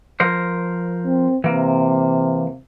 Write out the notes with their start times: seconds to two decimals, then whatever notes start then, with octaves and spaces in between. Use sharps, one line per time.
0.20 F3 A#4 C5
1.05 C4
1.44 C3 E3 A#3